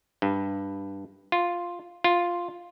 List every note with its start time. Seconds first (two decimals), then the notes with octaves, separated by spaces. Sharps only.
0.22 G2
1.32 F4
2.04 F4